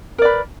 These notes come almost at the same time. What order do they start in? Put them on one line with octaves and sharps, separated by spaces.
A#4 D5 B4